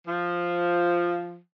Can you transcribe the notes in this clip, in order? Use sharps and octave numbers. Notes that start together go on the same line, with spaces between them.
F3